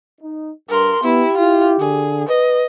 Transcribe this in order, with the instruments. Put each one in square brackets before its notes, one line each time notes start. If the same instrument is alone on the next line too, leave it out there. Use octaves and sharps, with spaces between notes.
[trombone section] D#4
[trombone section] G2 [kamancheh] A#4 C6
[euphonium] B3 [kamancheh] E4 [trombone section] G4
[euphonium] E4 [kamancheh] F4
[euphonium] D3 [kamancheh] G#4
[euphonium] B4 [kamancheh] D#5